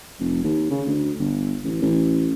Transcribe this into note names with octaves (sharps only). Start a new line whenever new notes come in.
F1
D#2
C#3
D2
G1
A1
A1